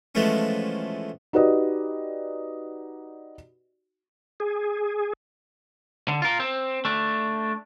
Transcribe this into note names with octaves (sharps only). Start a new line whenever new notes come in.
E3 F3 G#3 A3 B3 C#4
D#4 F#4 G4 B4 D5 D#5
G#4
D3
F4 A#4
C4
A3 D4